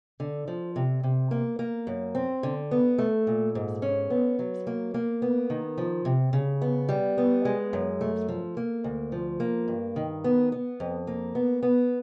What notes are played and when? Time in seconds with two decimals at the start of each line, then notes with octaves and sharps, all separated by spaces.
0.20 D3
0.48 F3
0.76 C3
1.03 C3
1.31 A#3
1.59 A#3
1.87 F#2
2.15 C4
2.43 D3
2.71 B3
2.98 A3
3.27 A#2
3.55 G#2
3.82 C#4
4.10 B3
4.39 F#3
4.67 A#3
4.94 A#3
5.22 B3
5.50 D#3
5.78 F3
6.05 C3
6.33 C#3
6.62 B3
6.89 G3
7.18 B3
7.45 G#3
7.73 F#2
8.01 A3
8.28 F3
8.57 A#3
8.84 D2
9.12 F3
9.40 A#3
9.68 G2
9.96 D#3
10.24 B3
10.52 B3
10.80 F2
11.07 A#3
11.35 B3
11.63 B3